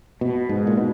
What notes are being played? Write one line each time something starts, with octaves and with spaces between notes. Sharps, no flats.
B2
G#2
A#2
B2